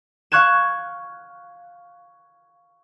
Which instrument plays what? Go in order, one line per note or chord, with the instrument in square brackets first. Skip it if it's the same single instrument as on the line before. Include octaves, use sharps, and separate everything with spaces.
[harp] F5 C#6 F#6 G#6 E7